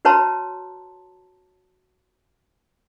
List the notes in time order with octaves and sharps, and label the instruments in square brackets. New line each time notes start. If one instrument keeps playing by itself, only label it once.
[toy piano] F#4 B4 C#5 A5 A#5 C6